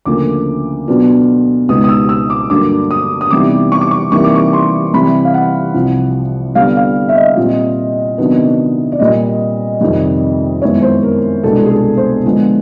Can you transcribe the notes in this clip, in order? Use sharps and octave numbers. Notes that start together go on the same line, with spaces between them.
D2 C#3 F3 A#3 D6
B2 F#3 B3 D4 F4
C#2 B2 G#3 B3 D#4 D#6
D#6
E6
E6
D6
G2 D3 F#3 A#3 D6
D#6
D#6
C3 E3 G3 B3 D#4 D6
C#6
D6
C#6
C3 E3 G3 A#3 D#4 C#6
D6
C#6
C6
C3 E3 G3 C4 B5
F5
F#5
C2 C3 F3
D3 G3 B3 F5
F5
E5
D#5
A#2 G3 C4 F4
C3 D#3 F#3 B3 D4
D5
A#2 G3 A#3 D#5
F2 C3 D#3 G3
F#2 D#3 G#3 B3 E4 C#5
C5
A#4
C2 B2 G#3 B3 D4 A4
G#4
A4
C5
D3 F3 G#3 B3